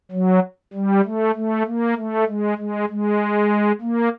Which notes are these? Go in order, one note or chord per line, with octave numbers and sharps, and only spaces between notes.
F#3
G3
A3
A3
A#3
A3
G#3
G#3
G#3
A#3